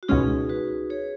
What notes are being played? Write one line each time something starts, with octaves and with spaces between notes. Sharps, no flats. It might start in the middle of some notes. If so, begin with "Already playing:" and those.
F#4
C#2 B2 G#3 C#4 D#4 G#4
F#4 B4
G#4 C#5